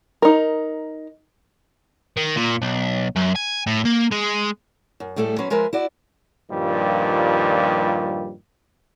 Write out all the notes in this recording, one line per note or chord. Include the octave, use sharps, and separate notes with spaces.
D#4 A#4
D#3
A#2
B1
F#2
G#5
A2
A#3
G#3
F#2
A2 G3 A3 G#4 A4
F#3 C#4 B4 C5
F3 G#3 A#4 B4 E5
E4 F#4 D5
G2 A#2 D#3 F3 G3